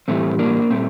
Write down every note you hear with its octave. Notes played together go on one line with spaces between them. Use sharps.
A2 E3 G3 A3 C4
A#3 D4
A#2 G3 A3 C4